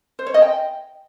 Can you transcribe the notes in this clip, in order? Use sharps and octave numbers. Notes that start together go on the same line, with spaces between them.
C5
C#5
D#5
G5